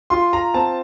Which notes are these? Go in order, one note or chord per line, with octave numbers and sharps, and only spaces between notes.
F4 C6
A#5
C4 A5